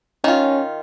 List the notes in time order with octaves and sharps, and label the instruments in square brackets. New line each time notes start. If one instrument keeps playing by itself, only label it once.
[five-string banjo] D#3 F4 [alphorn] C#4